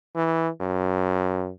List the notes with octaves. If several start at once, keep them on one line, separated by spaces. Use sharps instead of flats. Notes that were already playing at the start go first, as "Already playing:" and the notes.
E3
F#2